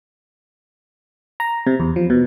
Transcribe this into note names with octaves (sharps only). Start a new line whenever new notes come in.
A#5
C3
E2
F3
B2